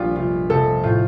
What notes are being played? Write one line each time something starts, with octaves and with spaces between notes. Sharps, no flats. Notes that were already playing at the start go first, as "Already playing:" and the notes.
Already playing: A#1 G3 F4 G4
F1 F4
F1 A4
A2 F4